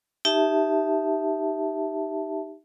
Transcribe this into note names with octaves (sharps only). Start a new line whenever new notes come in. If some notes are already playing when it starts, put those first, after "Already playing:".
D#4 G4 E5 A5